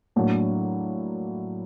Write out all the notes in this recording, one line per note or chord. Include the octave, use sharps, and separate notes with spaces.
A2 F#3 A#3 D4